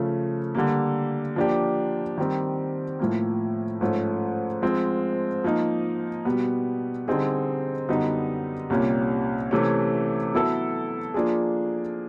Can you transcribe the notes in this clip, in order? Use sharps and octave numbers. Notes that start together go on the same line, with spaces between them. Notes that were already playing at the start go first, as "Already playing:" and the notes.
Already playing: C#3 F3 A3
D3 G3 A#3
F3 A#3 D4 G4
D#3 G3 C4
A2 F3 A#3
G#2 F3 A3 C#4
F3 G#3 C4
F3 A#3 D#4
B2 G3 B3
D3 G3 C4 D#4 G#4
F#2 D3 G3 B3 D#4
C2 A#2 G3 A#3 C#4
C3 E3 A3 C#4
F#3 B3 E4 A4
F3 A#3 D4 F4 G#4